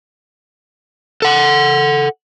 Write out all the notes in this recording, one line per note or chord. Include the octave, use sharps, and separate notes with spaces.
A4 F#5